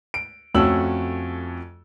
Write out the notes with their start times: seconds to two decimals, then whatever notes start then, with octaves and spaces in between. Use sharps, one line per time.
0.14 D7
0.55 F2 A3 C#4 F#4 E6 F#7